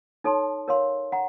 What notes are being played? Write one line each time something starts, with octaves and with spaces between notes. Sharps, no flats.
D#4 A4 C#5 A5 C6
A#4 C#5 F5 C6
F#5 A#5